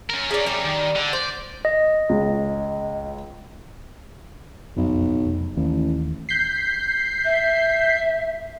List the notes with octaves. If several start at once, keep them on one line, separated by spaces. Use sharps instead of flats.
C#4 A#4
G#4 D5
G3 D5
D#3
D3
C5 D5
D#5
C#2
F#1 B1 F2
F1
A1 D#2
G6 B6 C7
E5